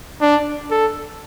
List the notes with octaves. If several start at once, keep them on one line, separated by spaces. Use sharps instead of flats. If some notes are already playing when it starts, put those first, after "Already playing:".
D4
A4